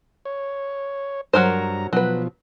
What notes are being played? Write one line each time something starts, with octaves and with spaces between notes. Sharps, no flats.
C#5
G2 F#3 A#4 C5 A#5
B2 F3 F#3 B4